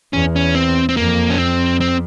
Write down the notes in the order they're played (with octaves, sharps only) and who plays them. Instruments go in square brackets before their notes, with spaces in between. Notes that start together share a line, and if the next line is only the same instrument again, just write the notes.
[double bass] E2 [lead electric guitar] C#4
[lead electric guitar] C#4
C4
C4
[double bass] F2 [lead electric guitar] A#3
[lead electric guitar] C#4
C4
C4